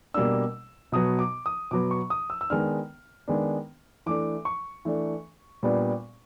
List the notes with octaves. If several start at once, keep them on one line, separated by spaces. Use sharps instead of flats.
B2 G3 A#3 D4 E6
B2 F#3 B3 D#6
D6
D#6
B2 F#3 B3 D6
C#6
D#6
E6
E6
D#3 G#3 B3 D4 F6
D#3 G#3 B3 D4
E3 A3 D4 D6
C#6
E3 A3 D4
A#2 G3 B3 D4